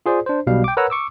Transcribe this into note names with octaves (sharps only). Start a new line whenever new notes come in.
F4 G#4 C5 D5
D4 C5
B1 B2 G3 F5
G5 D6
A#4 B4 C#5 F#5 A#5 E6
C#6 D6 E6